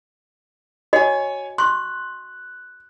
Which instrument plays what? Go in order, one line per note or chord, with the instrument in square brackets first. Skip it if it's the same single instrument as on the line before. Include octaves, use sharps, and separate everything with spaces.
[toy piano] F#4 D#5 [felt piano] C#5 G#5
[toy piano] C6 C#6 [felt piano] F#6